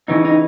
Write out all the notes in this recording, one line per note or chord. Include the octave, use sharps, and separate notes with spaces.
E2 C#3 E3 D#4
D#4